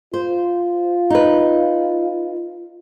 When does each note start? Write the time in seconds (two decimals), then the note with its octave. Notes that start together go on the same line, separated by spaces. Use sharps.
0.14 F4 C5
1.10 D#4 B4